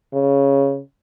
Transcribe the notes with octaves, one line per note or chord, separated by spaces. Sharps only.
C#3